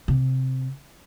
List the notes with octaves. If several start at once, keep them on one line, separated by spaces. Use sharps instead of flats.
C3